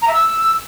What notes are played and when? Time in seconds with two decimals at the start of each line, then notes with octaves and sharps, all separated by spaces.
0.01 A#5
0.07 E5
0.12 E6